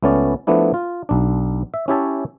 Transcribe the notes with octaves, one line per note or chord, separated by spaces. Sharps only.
C#2 A3 B3 C#4 D5
F3 A3 B3 D4 E4
F4
B1 D4
E5
C#4 E4 G4 C#5 E5 A5